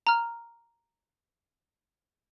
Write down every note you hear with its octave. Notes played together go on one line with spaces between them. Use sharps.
A#5 F6